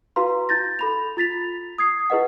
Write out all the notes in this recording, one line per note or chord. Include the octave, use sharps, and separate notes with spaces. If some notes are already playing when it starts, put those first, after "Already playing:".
E4 F#4 B4 F5 A#5 C6
E4 G6 A6 A#6
A4 B5 F7
F4 A6 B6 F7
D#6 G#6 C7
E4 G#4 B4 D#5 F#5